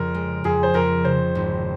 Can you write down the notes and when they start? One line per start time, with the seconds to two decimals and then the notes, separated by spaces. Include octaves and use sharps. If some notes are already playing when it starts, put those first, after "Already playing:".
Already playing: F2 C#3 A#4
0.14 G#3
0.44 F2 G#4
0.63 C5
0.74 F2 A#4
1.04 C#3 C5
1.35 G#1